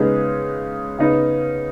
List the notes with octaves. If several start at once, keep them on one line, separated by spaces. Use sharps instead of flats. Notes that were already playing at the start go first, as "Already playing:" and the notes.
Already playing: C#3 G#3 B3 D#4 G#4
C#3 B3 D#4